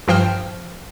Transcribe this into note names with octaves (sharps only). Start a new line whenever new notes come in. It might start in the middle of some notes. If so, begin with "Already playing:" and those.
G2 F3 C5 G5 F6